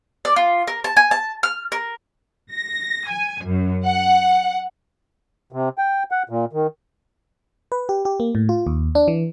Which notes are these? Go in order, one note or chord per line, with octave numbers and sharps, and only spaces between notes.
D5
F4
A#4
A5
G#5
A5
F6
A#4
A#6
G#5
F#2
F#5
C3
G5
F#5
A#2
D#3
B4
G4
G4
A#3
A2
F4
D#2
D4
E3